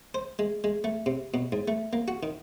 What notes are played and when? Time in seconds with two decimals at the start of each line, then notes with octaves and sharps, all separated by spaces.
0.15 C5
0.39 G#3
0.64 G#3
0.84 A3
1.06 C3
1.34 B2
1.52 G#2
1.68 A3
1.93 A#3
2.08 F#4
2.23 D#3